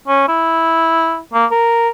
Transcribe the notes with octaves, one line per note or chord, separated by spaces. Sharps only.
C#4
E4
A#3
A#4